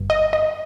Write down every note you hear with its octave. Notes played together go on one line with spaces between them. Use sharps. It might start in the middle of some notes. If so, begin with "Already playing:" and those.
Already playing: G1 G2
D#5
D#5